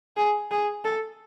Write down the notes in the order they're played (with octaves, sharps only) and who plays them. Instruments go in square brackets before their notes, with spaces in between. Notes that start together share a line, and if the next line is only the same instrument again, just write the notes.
[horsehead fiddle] G#4
G#4
A4